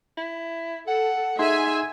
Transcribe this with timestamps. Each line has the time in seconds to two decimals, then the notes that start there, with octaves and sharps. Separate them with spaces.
0.17 E4
0.88 A4 F#5
1.39 D#4 G#4 E5 F#5 G#5 C6